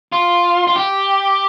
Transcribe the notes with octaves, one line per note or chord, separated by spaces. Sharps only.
F4
F4
G4